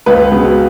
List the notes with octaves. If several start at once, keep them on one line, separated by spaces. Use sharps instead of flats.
C#2 B4
B2 G#3 B3